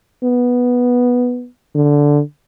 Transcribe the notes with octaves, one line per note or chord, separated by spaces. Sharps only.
B3
D3